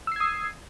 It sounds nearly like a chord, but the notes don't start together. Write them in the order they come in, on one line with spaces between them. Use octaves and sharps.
E6 C7 G#6 D#6